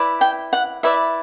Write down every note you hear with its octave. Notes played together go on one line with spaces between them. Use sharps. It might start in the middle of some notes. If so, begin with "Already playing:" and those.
Already playing: E4 B4 D5
G5
F#5
E4 B4 D5 E5